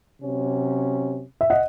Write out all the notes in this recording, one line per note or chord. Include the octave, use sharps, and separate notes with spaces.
C3 F#3 C#4
E5
D#5 F#5